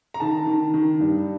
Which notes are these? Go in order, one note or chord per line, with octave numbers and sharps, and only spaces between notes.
A#5
D#3 A5
D#3
D#3
G2